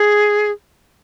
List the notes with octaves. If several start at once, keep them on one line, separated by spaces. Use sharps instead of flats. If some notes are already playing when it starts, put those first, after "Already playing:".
Already playing: G#4